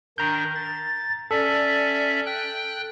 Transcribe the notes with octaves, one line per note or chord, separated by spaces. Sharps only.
D#3 D4 A#4 A#5 G6
A6
C#4 A4 D5 E5
G5 F#6